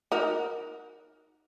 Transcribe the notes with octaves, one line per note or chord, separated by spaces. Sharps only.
D#4 F#4 A#4